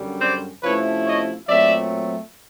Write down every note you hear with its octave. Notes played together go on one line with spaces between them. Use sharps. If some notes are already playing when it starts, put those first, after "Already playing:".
Already playing: F#2 D3 G3
C5 D5
C3 F3 A3 C#4 E4 B4 C#5
C#5 D#5
A#2 F#3 A3 C4 D5 E5